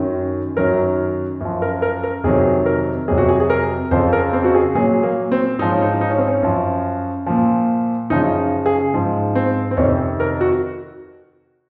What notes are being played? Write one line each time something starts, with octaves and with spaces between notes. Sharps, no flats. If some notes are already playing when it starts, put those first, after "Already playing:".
Already playing: F#2 D#3 F#3
F#2 D#3 F#3 A#4
F#2 F3
A#4
A#4
A#4
F2 C3 D#3 F#3 G#4
A#4
F2 C3 F#3 G#4
F#4
G#4
G#4
A#4
F2 C#3 F3 C5
A#4
C4
F#4
G#4
A#2 F#3 G#4
A#3
C4
G#2 F3 D#4
C#4
D#4
D#4
C#4
C4
C#4
F#2 F3
A#2 F3
F#2 C#3 F3 D#4
G#4
G#2 F3
C4
C4
F2 C3 D#3 C#4
A#4
F#4